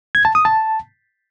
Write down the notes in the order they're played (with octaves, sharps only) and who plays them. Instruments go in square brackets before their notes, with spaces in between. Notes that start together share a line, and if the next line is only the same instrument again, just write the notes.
[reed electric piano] G#6
A5
D#6
A5